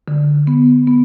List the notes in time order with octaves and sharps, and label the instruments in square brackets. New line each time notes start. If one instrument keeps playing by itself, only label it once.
[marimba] D3
B3
B3